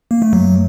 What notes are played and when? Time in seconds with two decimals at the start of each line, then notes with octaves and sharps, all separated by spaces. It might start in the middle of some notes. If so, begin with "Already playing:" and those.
0.11 A#3
0.22 A3
0.32 F#2 F#3